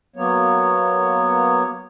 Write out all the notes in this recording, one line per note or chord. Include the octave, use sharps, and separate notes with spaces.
F#3 A#3 B3 C#5